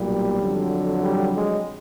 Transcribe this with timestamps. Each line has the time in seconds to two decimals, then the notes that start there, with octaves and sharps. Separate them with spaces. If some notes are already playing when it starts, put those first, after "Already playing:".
Already playing: B1 A#2 F#3 G3
0.41 F2 D3 F#3
1.02 G3
1.34 G#3